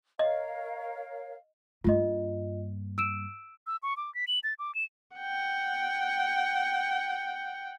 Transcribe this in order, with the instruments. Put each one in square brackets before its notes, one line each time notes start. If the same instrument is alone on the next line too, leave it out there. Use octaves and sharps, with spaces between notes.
[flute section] A#4 C#5 F5 [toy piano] D#5
[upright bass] G2 A#3 [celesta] F4 D#5
[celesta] E6 D7 E7
[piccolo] E6
C#6
D6
B6
F#7
A6
D6
E7
[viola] F#5 G5